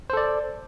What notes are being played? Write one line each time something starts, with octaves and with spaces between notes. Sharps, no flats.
A4 C5 D5